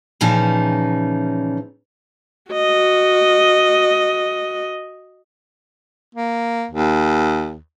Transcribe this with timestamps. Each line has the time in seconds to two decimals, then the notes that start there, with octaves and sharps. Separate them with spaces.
0.21 A#2 C#3 E3 F3 C#4 D#4
2.52 F#4 D#5
6.15 A#3
6.71 D#2